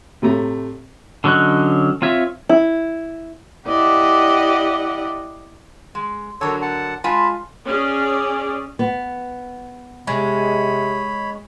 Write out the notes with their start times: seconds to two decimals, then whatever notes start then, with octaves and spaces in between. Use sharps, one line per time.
0.22 A2 C3 A3 A#5
1.24 D3 F#3 C#4 D#5 F#6
2.02 C4 F4 C#5 E5
2.49 E4
3.68 E4 G4 D5 D#5 F#5
5.95 G#3
6.41 D3 F#3 A4 A#4 C#5
6.62 F#5 A5
7.04 G#3 F4 G#5 A5 B5
7.65 C#4 G#4 D5
8.79 B3
10.07 C3 G#3 C#5 B5